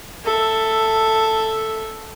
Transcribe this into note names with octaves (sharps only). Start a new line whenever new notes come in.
A4 E5